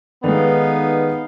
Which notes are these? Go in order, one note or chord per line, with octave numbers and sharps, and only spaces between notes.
D#3 G#3 B3 D#4 A4 B4 D5 F5